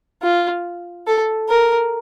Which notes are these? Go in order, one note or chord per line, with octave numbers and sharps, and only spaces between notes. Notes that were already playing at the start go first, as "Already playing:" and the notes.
F4
A4
A#4